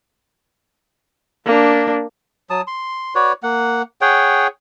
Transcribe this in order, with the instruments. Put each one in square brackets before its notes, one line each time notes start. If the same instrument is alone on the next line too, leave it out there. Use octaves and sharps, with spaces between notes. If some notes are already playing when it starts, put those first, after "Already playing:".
[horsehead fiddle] A#3 D4
[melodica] F#3 A5 D#6
C6
F#4 B4 C#5 D5
A#3 F#5
G#4 C#5 F#5 G5